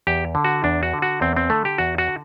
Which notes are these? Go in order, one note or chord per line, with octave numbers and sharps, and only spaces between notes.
E2 G4
D3
F#4
E2 D4
F#4
D3
F#4
E2 C4
C4
D3 A3
G4
E2 F#4
F#4
D3